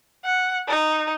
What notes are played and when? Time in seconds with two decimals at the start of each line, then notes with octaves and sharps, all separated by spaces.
0.25 F#5
0.68 D#4